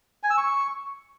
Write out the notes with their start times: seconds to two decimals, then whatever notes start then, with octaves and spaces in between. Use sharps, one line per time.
0.23 G#5
0.30 E6
0.37 C#6